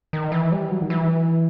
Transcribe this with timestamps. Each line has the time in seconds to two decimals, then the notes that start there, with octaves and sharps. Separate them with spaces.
0.13 D#3
0.32 E3
0.52 G3
0.71 F#3
0.82 D#3
0.90 E3